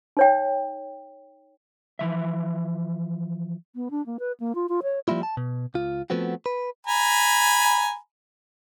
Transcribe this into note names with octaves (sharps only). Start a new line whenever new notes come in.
D#4 C#5 G5
E3 F3 E5
B3
D4
A#3
B4
A#3
F4
F4
C#5
F3 G3 A#3 E4 F4
A5
B2
C#2 F4
F3 A3 B3 C4 F#4
B4
G#5 A#5 B5